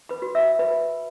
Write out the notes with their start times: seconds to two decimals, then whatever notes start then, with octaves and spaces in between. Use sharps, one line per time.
0.09 B4 B5
0.22 F#4
0.35 E5 E6
0.59 B4 B5